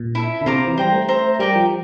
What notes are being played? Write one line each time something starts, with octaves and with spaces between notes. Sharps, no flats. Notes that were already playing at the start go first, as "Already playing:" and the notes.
Already playing: A#2
E4 A4 E5
D3
C3 C5 F5 A#5 D6
E3
G3 C5 G5 A#5
A3
C5 E5 A#5
G3 G4 A#4 D5 G5
F3